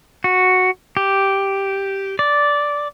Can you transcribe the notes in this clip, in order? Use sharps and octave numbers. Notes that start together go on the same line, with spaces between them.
F#4
G4
D5